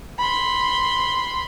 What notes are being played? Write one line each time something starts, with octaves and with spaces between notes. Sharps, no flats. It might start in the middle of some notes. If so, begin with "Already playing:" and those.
B5 C6